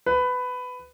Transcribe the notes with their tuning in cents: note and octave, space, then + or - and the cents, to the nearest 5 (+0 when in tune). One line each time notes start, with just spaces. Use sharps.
B4 +15